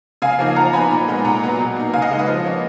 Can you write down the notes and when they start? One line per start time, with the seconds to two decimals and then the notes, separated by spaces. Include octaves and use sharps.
0.22 C#3 F5 G#5
0.39 F3 A#3 D#4
0.56 F3 F#5 A#5
0.73 B3 D#4 G#5 B5
0.91 A#2
1.08 G#3 B3 D#4
1.25 A#2 F#5 A#5
1.43 F#3 B3
1.59 B2
1.76 A#3 D#4
1.93 C#3 F5 G#5
2.02 D#5 F#5
2.11 G#3 D#4
2.19 B4 D#5
2.28 F3
2.45 A#3 C#4